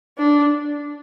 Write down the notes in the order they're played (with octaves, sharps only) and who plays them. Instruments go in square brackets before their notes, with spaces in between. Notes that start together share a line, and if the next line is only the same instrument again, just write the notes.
[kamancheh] D4